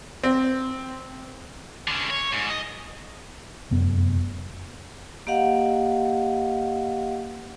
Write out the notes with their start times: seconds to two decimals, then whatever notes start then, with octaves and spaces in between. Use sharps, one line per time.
0.23 C4
1.88 D3 C#4
2.10 C#5
2.33 G#2
2.50 D#5
3.71 F1 F#2 B3
5.27 A#3 G4 D#5 F5 F#5